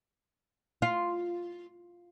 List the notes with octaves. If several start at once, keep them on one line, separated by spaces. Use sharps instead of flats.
F4